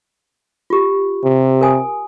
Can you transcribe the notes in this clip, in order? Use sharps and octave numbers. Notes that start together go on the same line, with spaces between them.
F4 G4
C3
A#4 G#5 D#6